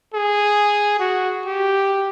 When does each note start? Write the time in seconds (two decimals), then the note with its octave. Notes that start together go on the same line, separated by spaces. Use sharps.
0.14 G#4
1.00 F#4
1.46 G4